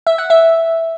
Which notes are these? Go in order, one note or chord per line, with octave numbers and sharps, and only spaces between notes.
E5
F#5
E5